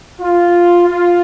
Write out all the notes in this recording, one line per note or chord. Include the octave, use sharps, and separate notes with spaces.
F4
F4